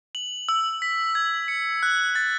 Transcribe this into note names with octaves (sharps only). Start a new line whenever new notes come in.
F#7
E6
B6
G#6
C#7
F#6
A6